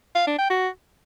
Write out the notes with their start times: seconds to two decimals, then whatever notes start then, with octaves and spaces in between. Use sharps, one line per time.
0.15 F5
0.27 D4
0.38 G5
0.50 F#4